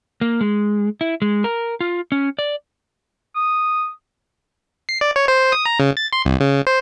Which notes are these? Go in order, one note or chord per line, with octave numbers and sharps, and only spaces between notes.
A#3
G#3
E4
G#3
A#4
F4
C#4
D5
D#6
C7
D5
C#5
C5
D#6
A#5
C#3
A6
C6
C2
C#3
C5